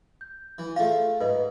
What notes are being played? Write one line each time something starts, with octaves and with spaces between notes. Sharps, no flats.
G6
E3
A3 F4 G#4 F5
G#2 B4 D#5